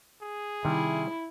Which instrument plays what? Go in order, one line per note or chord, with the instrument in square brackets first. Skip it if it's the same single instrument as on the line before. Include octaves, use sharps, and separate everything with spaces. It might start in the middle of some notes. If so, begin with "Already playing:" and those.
[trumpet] G#4
[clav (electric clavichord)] C3 G3 [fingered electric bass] D#3 [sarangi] E4